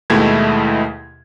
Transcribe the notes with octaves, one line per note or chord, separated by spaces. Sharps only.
D#2 B2 G#3 A3 E4 G#6